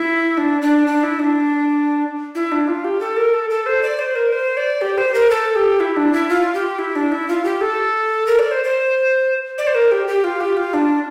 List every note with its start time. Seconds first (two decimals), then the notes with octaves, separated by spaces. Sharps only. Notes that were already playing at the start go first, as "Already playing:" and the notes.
Already playing: E4
0.37 D4
0.62 D4
0.87 D4
1.03 E4
1.19 D4
2.35 E4
2.52 D4
2.67 F4
2.84 G4
3.01 A4
3.17 A#4
3.33 A4
3.50 A4
3.66 C5
3.83 D5
3.99 C5
4.15 A#4
4.32 C5
4.57 D5
4.81 G4
4.98 C5
5.14 A#4
5.31 A4
5.56 G4
5.80 E4
5.97 D4
6.13 E4
6.29 F4
6.54 G4
6.79 E4
6.96 D4
7.12 E4
7.29 F4
7.44 G4
7.61 A4
8.27 A#4
8.39 D5
8.51 C5
8.64 C5
9.58 D5
9.67 C5
9.75 A#4
9.92 G4
10.07 G4
10.24 F4
10.41 G4
10.57 F4
10.74 D4